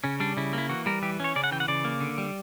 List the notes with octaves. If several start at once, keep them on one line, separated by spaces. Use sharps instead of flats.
C#3 C#4
G3 D4
C#3 E4
A#3 E4
E3 F#4
G3 A#4
E3 G4
C#4 C#5
C#3 D5
F#5
E3 G5
F#5
C#3 D5
A#3
D3
G3